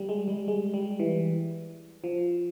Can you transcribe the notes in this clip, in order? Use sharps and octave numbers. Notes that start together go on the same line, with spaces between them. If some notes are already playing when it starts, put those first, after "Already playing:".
Already playing: G3
G#3
G3
G#3
G3
E3
F3